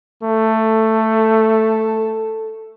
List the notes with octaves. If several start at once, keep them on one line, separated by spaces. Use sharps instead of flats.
A3 A4